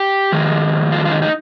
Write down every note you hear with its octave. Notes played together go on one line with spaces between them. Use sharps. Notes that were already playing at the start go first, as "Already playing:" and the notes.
Already playing: G4
F2 D#3 G#3
F4
F4
D#4
D#4